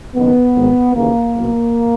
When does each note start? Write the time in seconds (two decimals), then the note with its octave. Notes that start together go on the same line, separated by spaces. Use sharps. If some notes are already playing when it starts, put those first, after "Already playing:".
0.15 F#1 F#2 D#3 B3
0.56 G#1 G#2 D#3
0.95 D#2 C#3 E3 A#3
1.35 F#1 E2 B2